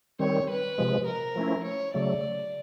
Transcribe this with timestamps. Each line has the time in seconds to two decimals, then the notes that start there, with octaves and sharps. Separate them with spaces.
0.19 D#3 G3 C4 C#5
0.48 B4
0.78 C3 F3 G#3
1.07 A#4
1.36 F3 A3 C#4 E4
1.64 C#5
1.94 C#3 F#3 A3 D5